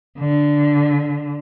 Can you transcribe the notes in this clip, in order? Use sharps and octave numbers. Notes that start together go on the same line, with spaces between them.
D3